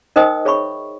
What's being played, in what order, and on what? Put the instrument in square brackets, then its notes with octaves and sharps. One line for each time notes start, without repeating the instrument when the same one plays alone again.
[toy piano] D#4 A#4 C5 D#5 G5 D#6
G#4 C#5 E5 B5 C#6